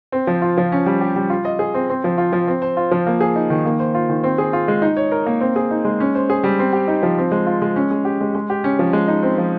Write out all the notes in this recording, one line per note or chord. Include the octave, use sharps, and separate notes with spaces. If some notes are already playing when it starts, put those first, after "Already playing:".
C4
F3
F4
F3
C#4
G3
G4
G3
F4
D#5
G#4
C4
C4
F3
F4
F3
C4
C5
F4
F3
A#3
G#4
D#4
D#3
A#3
C5
F4
D#3
C4
G#4
F4
G#3
D#4
C#5
A#4
A#3
C4
G#4
D#4
G#3
C#4
C5
G#4
G3
C4
G4
D#4
F3
C4
G#3
F4
G#3
C#4
G#3
G4
G#3
G#3
G4
C#4
F3
G#3
D#4
C4
F3